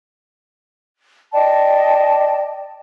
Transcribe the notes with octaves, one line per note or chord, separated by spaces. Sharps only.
D5 D#5 G5 A5